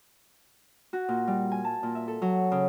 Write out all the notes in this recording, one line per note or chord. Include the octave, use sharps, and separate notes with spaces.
F#4
A#2
G3
G#5
A5
A#2
E5
A4
F#3
C#3